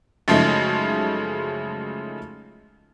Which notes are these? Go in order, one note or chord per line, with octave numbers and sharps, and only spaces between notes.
F#2 C#3 F3 G#3 A3 D#4